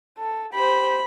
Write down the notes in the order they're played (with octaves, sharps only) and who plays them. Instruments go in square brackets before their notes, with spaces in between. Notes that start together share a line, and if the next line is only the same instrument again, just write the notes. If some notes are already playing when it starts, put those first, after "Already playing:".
[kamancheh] A4
[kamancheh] G4 C5 [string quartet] B5